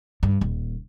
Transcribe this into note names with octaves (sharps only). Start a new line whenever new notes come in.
G2
D#1